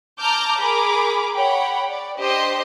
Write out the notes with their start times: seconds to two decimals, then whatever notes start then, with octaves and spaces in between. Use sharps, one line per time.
0.20 A5 A#5 D6 F6 G6
0.59 G#4 A#4 B5 D6
1.36 C#5 F#5 G5 B5
1.89 D5
2.19 D4 G4 C5 D#5 C6